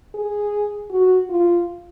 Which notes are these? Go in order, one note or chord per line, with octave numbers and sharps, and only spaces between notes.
G#4
F#4
F4